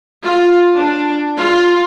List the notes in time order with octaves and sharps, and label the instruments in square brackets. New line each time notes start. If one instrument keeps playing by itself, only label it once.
[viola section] F4
D4
F4